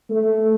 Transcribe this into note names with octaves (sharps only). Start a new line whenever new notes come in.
A3